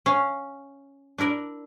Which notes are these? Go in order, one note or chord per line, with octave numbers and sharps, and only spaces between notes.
C#4 F5
D4 E4 A#4 D5